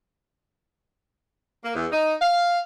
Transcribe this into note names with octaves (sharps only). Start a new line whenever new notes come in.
A#3
E2
D#4
F5